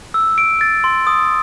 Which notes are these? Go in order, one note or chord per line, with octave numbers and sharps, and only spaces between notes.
E6
D7
A6
C6
D#6